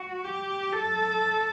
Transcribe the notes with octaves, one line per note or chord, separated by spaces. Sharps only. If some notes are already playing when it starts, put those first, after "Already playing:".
Already playing: F#4
G4
A4